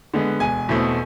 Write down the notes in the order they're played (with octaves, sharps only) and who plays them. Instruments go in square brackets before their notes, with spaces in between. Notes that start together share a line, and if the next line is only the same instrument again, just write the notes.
[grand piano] D3 G#3 B3
E1 G#5
E2 B2 A3 C4